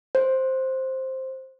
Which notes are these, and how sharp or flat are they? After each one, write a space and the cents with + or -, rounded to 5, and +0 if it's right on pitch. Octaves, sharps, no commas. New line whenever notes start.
C5 +5